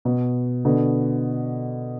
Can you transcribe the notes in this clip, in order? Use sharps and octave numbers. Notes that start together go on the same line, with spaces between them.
B2
B2 D3